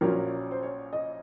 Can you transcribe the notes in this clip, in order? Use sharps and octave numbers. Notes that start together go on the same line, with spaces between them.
A#1 A#2 F#3 C#4 F4 A#4
C5
C#5
D#5